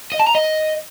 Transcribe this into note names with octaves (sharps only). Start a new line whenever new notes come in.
D#5
A5
A#5
D#5